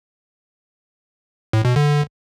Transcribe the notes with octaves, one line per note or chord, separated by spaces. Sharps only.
A2
B2
D3